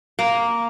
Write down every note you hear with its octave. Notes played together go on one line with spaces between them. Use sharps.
A#3